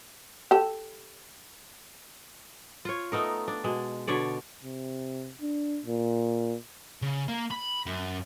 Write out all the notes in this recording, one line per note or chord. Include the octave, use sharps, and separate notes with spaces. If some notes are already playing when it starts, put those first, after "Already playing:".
G4 A4
F4 C#5
A3 B3 D#4 A#4
D4
B2 G#3
B2 D3 C#5 D5
C3
D4
A#2
C#3
A#3
B5
F#2